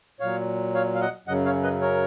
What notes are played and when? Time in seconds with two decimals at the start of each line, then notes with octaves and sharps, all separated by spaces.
0.20 A#2 F#3 C#5 F5
0.75 C#5 F5
0.95 F5
1.01 D#5 F#5
1.27 F#2 C#3 F#3 D#5 F#5
1.45 C#5 F5
1.63 B4 D#5
1.81 A#4 C#5